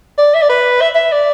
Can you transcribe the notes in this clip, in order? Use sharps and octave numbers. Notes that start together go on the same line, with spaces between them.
D5
E5
D5
B4
E5
E5
D5